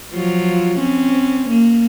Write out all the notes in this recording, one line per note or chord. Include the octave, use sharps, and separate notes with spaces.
F3 F#3 F4
C4 C#4
A#3